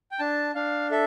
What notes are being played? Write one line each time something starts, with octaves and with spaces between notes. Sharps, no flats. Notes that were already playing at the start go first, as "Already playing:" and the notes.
G5
D4 A5
D4 F5
A4 E5